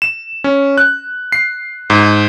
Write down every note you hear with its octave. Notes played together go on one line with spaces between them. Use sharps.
E7
C#4
F#6
C7
G#2